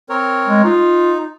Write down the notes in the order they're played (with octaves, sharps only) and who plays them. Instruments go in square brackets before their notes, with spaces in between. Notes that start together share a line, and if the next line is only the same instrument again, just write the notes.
[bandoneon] C4 A#4 C#5
[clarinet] G#3
[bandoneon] D#4 [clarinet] F4